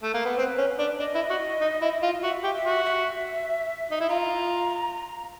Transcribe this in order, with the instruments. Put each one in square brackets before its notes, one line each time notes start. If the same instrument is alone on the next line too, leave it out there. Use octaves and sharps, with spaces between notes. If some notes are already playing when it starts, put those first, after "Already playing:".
[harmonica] A3
A#3
B3
[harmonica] C4 [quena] B4
[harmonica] C#4
D4
[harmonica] D4 [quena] D#5
[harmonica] E4
F#4
D#4
E4
F4
[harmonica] F#4 [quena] E5
[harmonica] G4
[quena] E5
[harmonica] F#4
[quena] E5
[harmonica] D#4
E4
[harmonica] F4 [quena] A#5